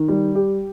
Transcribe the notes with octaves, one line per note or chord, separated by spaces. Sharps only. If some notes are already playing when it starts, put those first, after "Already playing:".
Already playing: D#3
G3
G4